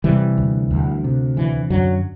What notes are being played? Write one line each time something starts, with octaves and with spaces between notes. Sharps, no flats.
C3 E3 G3
D2
D2
C3
D3 E3
F#2 D3 F#3